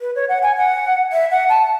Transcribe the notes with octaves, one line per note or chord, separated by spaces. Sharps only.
B4
C#5
F#5
G#5
F#5
E5
F#5
A5